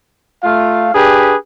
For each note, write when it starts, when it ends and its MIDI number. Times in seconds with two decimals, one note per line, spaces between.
0.43 0.89 57
0.43 0.89 65
0.43 0.89 77
0.94 1.34 62
0.94 1.34 67
0.94 1.34 68
0.94 1.34 71